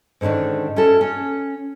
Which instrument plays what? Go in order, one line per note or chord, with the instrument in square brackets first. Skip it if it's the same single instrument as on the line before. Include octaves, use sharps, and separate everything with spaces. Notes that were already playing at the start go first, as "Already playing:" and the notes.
[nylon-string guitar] G#2 D3 D#3 C#4 D4
C#4 E4 F#4 A4
C#4